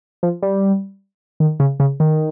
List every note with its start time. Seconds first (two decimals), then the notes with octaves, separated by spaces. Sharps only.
0.23 F3
0.42 G3
1.40 D#3
1.60 C#3
1.80 C#3
2.00 D#3